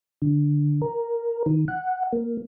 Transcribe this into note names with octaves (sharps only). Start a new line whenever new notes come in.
D3
A#4
D#3
F#5
A#3